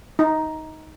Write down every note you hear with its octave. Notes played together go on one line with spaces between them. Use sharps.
D#4